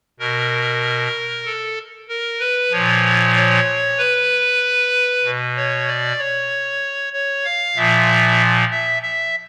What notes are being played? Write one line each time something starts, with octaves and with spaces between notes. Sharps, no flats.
B2 A#4
A4
A#4
B4
A#2 F3 C#5
C#5
B4
B2
C#5
D5
C#5
C#5
F5
A#2 F3 E5
E5
E5